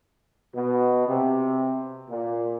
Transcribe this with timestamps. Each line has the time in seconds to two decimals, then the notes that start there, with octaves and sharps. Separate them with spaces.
0.54 B2
1.06 C3
2.09 A#2